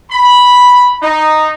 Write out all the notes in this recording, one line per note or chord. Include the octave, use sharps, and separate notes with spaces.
B5
D#4